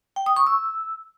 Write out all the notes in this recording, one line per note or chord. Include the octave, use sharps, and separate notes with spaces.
G5
D#6
C#6
E6